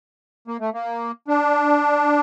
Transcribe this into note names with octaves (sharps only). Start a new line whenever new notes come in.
A#3
A3
A#3
D4